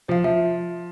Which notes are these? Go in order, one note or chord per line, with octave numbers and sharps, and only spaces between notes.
F3 C5 F5
F3 E5